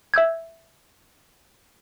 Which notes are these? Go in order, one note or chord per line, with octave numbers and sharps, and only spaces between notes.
E5 E6 G6 G#6